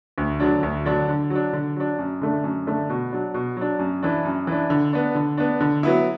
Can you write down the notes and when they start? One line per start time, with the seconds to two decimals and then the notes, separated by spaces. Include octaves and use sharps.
0.18 D2
0.40 D3 F#3 D4
0.63 D2
0.86 D3 F#3 D4
1.09 D3
1.30 F#3 D4
1.53 D3
1.76 F#3 D4
1.98 F#2
2.21 D3 A3 D4
2.44 F#2
2.67 D3 A3 D4
2.89 B2
3.12 F#3 D4
3.34 B2
3.57 F#3 D4
3.79 F#2
4.03 E3 D4
4.25 F#2
4.47 E3 D4
4.70 D3
4.93 B3 D4
5.15 D3
5.37 B3 D4
5.60 D3
5.83 F#3 B3 E4